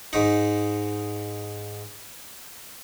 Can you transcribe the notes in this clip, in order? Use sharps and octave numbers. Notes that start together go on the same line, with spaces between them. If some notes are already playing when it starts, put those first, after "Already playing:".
G#2 D#4